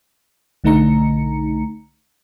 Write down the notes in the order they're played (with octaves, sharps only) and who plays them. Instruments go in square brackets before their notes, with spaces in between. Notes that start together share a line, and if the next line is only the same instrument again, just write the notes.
[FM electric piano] B1 D3 A3 D#4 A#5 C#7